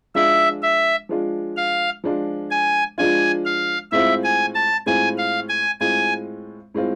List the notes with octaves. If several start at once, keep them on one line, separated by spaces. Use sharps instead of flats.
F3 G#3 D4 F4 E5
E5
F3 G#3 D4 F4
F5
F3 G#3 D4 F4
G#5
F3 G#3 D4 F4 G#5
F5
A2 G#3 C4 F4 E5
G#5
A5
A2 G#3 C4 F4 G#5
F5
G#5
A2 G#3 C4 F4 G#5
A2 G#3 C4 F4